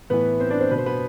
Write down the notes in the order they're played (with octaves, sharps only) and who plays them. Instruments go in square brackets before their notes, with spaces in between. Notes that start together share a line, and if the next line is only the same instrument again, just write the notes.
[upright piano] A2 E3 B3 B4
C4 C5
D4 D5
C4 C5
B2 B4
C5
B3 B4